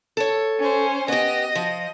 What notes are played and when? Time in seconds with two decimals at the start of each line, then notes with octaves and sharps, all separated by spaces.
0.17 A4 C#5
0.59 C#4 C5
1.08 B3 G4 D#5
1.55 F3